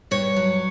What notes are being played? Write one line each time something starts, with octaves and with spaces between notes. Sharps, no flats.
G2 C#5
F#3